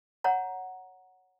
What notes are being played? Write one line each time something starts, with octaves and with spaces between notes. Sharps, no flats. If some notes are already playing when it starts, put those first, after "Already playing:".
C#5 F#5 A#5